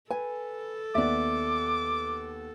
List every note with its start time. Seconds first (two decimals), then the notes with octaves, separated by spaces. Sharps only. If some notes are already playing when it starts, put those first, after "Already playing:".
0.10 A4 B4 G#5
0.95 D#2 B3 D5 E5 D6